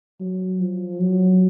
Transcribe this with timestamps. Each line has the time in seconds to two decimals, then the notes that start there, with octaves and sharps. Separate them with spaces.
0.20 F#3
0.61 F3
1.00 F#3